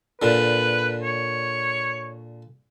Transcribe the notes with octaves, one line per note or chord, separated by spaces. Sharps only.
A#2 D3 B4
C#5